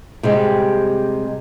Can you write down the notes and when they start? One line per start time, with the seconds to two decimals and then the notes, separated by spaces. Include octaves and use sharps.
0.23 C3 G3 G#3